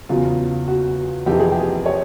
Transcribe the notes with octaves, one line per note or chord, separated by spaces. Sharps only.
E2 C#3 F#3 F4
F#4
F2 C3 E3 G4
G#4
G4
C#5